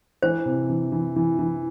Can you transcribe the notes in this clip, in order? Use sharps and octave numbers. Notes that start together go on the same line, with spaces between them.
E3 C5
C3
E3
E3
E3
E3